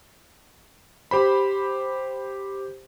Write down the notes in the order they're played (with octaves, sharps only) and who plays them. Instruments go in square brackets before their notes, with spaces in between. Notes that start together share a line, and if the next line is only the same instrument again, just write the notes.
[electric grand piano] G4 C5 B5